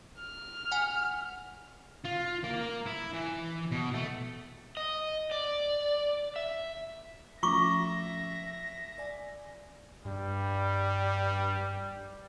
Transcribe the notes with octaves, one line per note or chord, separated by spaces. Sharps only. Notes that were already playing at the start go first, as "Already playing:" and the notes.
F6
F#5 G#5
F4
A#3 F5
E4
E3
B2
A3
D#5
D5
E5
F3 A3 C#4 F4 E5 C#6 D6 A#6
D5 G#5
G2 G3